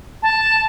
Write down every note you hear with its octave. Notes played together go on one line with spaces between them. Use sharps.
A5